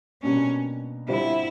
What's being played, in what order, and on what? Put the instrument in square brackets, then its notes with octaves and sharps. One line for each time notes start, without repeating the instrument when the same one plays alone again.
[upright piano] B2 G3 A#3 D4 [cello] C#4
[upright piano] D3 G3 C4 F4 [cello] E4